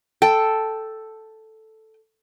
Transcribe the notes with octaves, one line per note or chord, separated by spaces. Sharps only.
A4 G5